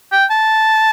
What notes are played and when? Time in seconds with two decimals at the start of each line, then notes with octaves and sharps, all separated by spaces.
0.12 G5
0.30 A5